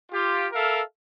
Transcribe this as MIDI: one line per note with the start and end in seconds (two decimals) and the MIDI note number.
0.11 0.46 65
0.11 0.46 67
0.52 0.80 69
0.52 0.80 70
0.52 0.80 76
0.52 0.80 77